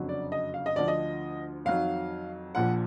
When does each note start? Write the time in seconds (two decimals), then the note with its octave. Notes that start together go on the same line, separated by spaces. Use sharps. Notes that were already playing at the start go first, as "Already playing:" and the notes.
Already playing: F#1 F2 D3 F#3
0.09 D5
0.32 D#5
0.54 F5
0.66 D#5
0.76 D2 D3 F3 D5
0.88 D#5
1.65 F2 D#3 F#3 F5
2.55 A#1 A#2 F3 F#5